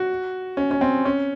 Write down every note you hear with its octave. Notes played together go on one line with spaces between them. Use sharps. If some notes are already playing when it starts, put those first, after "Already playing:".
Already playing: F#4
C#4
C#4
C4
C#4